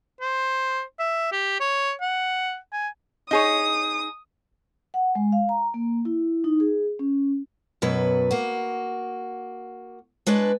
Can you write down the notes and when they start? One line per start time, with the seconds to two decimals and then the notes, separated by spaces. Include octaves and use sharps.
0.21 C5
0.99 E5
1.32 G4
1.60 C#5
2.01 F#5
2.73 G#5
3.31 D#4 G#4 C#5 D#6
4.94 F#5
5.15 G#3
5.32 F5
5.49 A#5
5.74 A#3
6.05 E4
6.44 D#4
6.60 G#4
6.99 C#4
7.82 F#2 B2 F#3 B4
8.31 A#3 F#4
10.27 G#3 D4 B4 C#5